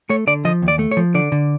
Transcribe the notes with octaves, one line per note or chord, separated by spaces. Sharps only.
A3 C#5
D3 D5
F3 D#5
D#2
D5
A3
C#5
F3
D3 D5
D3